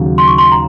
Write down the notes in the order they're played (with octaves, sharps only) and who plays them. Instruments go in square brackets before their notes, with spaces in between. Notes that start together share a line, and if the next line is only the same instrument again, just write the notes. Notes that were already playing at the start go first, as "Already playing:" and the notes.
Already playing: [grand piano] D#2 C#3 F#3
[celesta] C6
C#6
C6
A#5